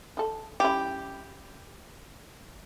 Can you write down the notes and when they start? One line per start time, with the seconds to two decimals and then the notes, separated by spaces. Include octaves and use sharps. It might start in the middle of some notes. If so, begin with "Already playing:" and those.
0.17 D#4 A4
0.60 G3 C#4 E4 G4